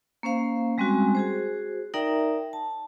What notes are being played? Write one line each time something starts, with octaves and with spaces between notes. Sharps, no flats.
A#3 C#4 C5 F5
G3 G#3 C4 C#4 F#4 G#5
F#4 G#4 C5
D#4 A#4 D5 E5 G5 A#5
A5